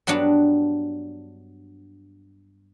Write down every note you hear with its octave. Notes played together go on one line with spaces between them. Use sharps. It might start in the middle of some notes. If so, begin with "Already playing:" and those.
G2 F#3 B3 D4 F#4